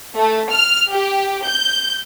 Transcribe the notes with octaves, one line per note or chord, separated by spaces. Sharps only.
A3
F6
G4
G6